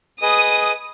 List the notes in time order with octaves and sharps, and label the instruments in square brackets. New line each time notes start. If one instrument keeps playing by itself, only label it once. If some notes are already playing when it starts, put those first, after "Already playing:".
[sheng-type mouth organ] G#4 B4 D#5 [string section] D#6